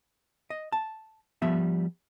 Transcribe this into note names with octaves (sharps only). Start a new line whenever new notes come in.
D#5
A5
F3 G3 B3 E5